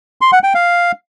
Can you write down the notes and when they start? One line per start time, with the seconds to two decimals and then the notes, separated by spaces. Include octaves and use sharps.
0.21 C6
0.32 F#5
0.43 G5
0.55 F5